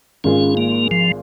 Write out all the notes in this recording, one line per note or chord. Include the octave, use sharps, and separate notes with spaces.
G#1 G#2 G#3 C#4 F4 G#4
A#3
F3